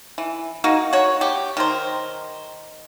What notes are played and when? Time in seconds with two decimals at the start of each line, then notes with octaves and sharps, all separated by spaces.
0.18 E3
0.64 A#3 D#4 F#4
0.93 F#4 C#5
1.21 G4
1.57 D#3 A#4 C5